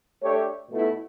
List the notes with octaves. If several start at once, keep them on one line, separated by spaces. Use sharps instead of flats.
A3 D4 G4 C#5
B2 A3 E4